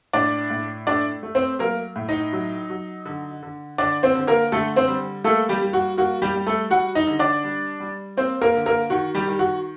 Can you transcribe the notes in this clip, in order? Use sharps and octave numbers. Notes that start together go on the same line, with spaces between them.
A2 D4 D5
A2
A3 D4 D5
A3
C4 C5
F#3 A#3 A#4
A2
D#4 D#5
F#3
F#3
D3
D3
D3 D4 D5
C4 C5
D3
A#3 A#4
D3 A3 A4
C4 C5
G3
A3 A#3 A4
G3 G4
G3
F#4
A#3 F#4
G3 G4
G3
A3 A4
G3 F#4 F#5
D#4 D#5
D3
D4 D5
G3
G3
A#3 C4 C5
A#3 A#4
D3
A#3 A#4
D#3 F#4
G3 G4
D#3
F#4